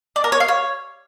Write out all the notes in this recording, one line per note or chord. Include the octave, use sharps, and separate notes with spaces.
D5
A#4
C#5
F5
C#5